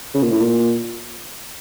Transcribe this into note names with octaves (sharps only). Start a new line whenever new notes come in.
C#3
A#2
A2
A#2